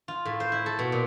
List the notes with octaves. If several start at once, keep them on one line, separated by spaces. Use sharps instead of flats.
F4
A2
C5
E4
A4
B2
A#2